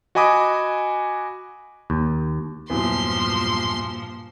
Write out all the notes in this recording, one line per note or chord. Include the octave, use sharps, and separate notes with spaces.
F#4 D#5 G#5 B5 D6 D#6
D#2
E2 G2 A#2 F3 F#3 C6